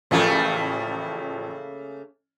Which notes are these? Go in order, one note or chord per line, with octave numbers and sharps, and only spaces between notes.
A1 C#3 F3 A3 A#3